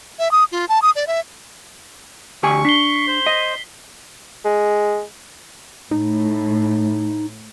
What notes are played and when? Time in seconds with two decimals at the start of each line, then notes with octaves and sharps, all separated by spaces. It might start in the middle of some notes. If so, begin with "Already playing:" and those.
0.19 E5
0.31 D#6
0.52 F4
0.69 A5
0.82 D#6
0.95 D5
1.07 E5
2.43 D2 G4 G#5 C#6
2.65 D4 B6 C7 G7
3.07 C5
3.26 D#5
4.45 G#3
5.91 A2 D#4